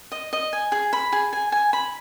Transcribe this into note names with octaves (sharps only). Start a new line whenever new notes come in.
D#5
D#5
G#5
G#4
B5
G#4
G#5
G#5
B5